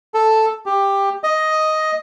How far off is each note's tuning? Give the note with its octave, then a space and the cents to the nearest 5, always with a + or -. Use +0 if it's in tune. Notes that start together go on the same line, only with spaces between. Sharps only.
A4 +0
G4 +10
D#5 +5